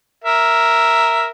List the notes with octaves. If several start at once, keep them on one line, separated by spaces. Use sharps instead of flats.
A#4 E5